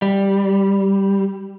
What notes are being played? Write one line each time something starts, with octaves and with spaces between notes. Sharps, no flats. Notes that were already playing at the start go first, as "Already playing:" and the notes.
G3